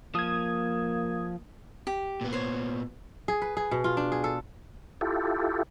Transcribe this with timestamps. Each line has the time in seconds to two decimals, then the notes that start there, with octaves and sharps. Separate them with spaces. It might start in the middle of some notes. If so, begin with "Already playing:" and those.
0.15 F3 A#3 D#6 G#6
1.87 G4
2.21 A#2 B3
2.33 C5 C#5
3.28 G#4
3.42 B4
3.57 G#4
3.71 B2
3.84 F4
3.97 D4
4.12 G#4
4.24 A4
5.01 E4 F4 G4 A4